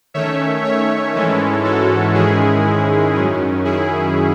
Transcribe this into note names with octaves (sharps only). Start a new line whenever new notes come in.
D#3 A3 C#4 C#5 E5
C#5 E5
G#2 E3 G#3 C#4 E4 A4 C#5
F#4 A4
G#2 D#3 G#3 C#4 E4 G#4
F#2 D#3 F#3 C#4
E4 G#4